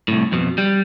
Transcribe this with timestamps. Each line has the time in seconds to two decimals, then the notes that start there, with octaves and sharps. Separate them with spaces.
0.08 C2 A2
0.32 F2 B2
0.58 G3